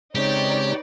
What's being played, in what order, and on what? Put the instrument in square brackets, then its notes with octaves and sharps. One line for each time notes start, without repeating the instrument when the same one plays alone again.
[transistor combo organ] C#3 G#3 C4 [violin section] D#4 B4 D5 [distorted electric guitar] G4 [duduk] C#5